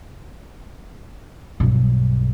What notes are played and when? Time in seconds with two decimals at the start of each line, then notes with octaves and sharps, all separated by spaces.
1.60 B1 G2